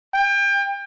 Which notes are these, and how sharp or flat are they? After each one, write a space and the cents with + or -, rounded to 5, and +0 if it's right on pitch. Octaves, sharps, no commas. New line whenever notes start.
G5 +30